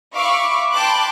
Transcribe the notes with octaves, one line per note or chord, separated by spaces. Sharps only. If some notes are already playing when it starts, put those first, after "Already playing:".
E5 F5 B5 C#6 D6
G5 A5 B5 C6 D6 F#6